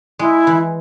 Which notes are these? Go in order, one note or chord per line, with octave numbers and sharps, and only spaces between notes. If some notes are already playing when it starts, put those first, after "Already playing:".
G#3 E4
E3